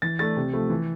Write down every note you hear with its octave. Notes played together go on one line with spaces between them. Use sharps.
E3 A6
A3 D4 A6
C3
F3 A3
E3